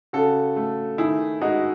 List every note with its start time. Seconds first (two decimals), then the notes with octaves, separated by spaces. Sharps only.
0.13 C#3 F#4 A4
0.56 A3
0.98 D#3 E4 G#4
1.41 G#3 D#4 F#4